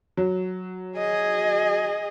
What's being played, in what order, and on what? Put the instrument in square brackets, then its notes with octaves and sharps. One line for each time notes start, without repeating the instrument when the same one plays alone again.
[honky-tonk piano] F#3
[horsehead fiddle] G#4 D#5